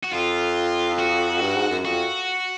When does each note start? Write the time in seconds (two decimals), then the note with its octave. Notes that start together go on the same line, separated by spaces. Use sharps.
0.03 F#4
0.12 F2 F4
0.99 F#4
1.41 G2
1.56 G#2
1.70 F#2
1.84 F2 F#4